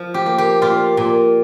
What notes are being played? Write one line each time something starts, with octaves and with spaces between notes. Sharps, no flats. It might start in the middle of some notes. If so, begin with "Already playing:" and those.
Already playing: F3
G4
A#3
G4
A#2 F4
A#2